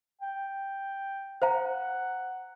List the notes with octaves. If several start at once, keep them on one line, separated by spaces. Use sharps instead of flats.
G5
C5 F5 F#5 A#5